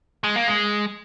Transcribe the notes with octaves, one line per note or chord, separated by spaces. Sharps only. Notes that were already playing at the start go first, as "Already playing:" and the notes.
G#3
A#3
G#3